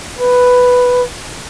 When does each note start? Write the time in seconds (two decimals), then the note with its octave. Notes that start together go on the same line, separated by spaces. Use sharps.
0.19 B4